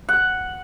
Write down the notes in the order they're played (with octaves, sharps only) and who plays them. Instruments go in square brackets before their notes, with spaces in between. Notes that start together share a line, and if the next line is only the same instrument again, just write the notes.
[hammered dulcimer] F#5